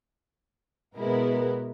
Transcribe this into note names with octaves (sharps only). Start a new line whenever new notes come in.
B2 G#3 B3 E4 A#4